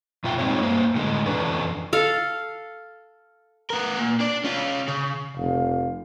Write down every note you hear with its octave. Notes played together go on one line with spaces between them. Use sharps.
B2 F4 E5 G5
G3 G#3 C4 D#4 G#4 C#5
G2 A#3 C5
A2 D3 G#3
F2 E3 C#4 D4 A4 B4
A4 F5
B3 A#4
A#2
D4 D5
C#4 F4
C#3
F1 F5